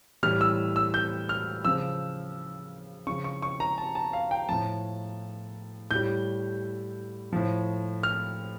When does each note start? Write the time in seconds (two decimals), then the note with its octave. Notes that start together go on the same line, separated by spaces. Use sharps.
0.23 A2 E3 G3 F6
0.41 E6
0.76 E6
0.94 G6
1.29 F6
1.65 C#3 F3 E6
3.07 C#3 F3 C#6
3.24 C#6
3.42 C#6
3.60 A#5
3.78 A5
3.95 A5
4.13 F5
4.31 G5
4.49 A2 F3 A5
5.91 A2 G3 G6
7.33 A2 F3
8.03 F6